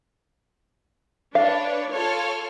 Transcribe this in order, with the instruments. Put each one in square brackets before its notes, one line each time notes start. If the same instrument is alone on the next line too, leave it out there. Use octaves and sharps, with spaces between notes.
[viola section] D4 [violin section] B4 C#5 [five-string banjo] F5
[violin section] F4 A4 F6 [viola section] C#5